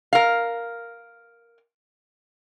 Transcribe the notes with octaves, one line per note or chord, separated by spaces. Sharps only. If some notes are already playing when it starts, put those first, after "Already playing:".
A#4 F5